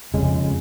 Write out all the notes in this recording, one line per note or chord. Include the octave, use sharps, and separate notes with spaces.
F2 C#3 G#3